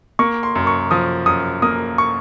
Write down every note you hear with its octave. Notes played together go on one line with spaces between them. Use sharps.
A#3 C#6
C6
F#2
C#6
F3 D#6
F#2 D#6
A#3 D#6
C#6